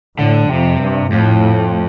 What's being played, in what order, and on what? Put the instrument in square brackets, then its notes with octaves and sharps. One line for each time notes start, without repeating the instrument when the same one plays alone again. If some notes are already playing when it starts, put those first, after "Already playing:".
[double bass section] A2 [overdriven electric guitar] D3
[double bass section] F2 [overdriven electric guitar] C3
[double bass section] G2
[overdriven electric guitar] F2 [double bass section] A2